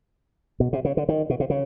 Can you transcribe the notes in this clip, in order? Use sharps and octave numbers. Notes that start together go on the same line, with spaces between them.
B2
C3
C#3
D3
D#3
B2
C3
C#3